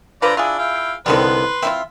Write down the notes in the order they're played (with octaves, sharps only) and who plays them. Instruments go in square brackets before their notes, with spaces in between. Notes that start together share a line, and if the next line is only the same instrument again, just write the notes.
[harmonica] D3 D5 A#5 [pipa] F4 B4 C5
[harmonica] D4 E4 [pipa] F4 G#4
[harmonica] E4 F5 G5
[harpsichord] C2 D3 G3 [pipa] D#3 F3 B3 [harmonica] B4 C6
[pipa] C4 E4 F4 [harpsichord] E5